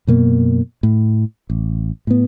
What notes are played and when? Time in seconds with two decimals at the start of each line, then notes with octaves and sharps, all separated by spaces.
0.07 F#2 B2 A#3
0.83 A2
1.50 A1
2.07 A2 B3